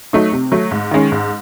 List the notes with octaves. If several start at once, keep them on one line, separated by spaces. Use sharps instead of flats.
F#3 A3 D#4
C3
F#3 A3
G#2
D#3 G#3 C#4
G#2